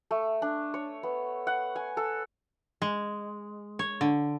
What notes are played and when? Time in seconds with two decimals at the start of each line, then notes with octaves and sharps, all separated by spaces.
0.11 A3
0.42 D4
0.74 C#5
1.03 B3
1.47 F#5
1.76 G#5
1.97 A4
2.82 G#3
3.79 C#5
4.01 D3